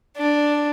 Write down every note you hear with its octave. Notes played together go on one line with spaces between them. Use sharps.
D4